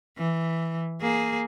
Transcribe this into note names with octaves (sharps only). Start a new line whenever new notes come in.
E3
A#3 G#4